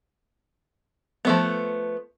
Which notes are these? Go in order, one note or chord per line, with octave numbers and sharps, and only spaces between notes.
F3 A3 B3